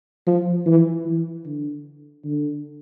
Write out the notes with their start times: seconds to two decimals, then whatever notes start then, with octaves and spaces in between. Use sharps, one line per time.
0.26 F3
0.66 E3
1.05 E3
1.45 D3
2.24 D3